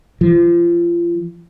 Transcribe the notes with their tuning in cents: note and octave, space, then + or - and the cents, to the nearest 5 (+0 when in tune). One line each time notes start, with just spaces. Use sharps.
F3 -30